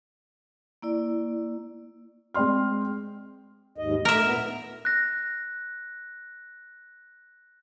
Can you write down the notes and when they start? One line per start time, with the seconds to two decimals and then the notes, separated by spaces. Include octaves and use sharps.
0.82 A#3 E4 D5
2.34 G#3 C4 D5 C6 F6
3.78 D#2 G#2 D#5
4.05 A3 A#4 E5
4.23 A#2 B3
4.85 F#6 A#6